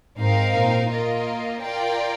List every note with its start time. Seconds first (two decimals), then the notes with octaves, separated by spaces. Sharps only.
0.18 G#2 C4 D#4 A#4 F5
0.54 A#2
0.90 A#3 F4 A#4 D#5
1.61 F4 A#4 D5 G5